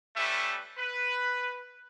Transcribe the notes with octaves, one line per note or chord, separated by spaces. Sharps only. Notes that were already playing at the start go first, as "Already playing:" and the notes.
G3 A3 C#4 B4 E5
B4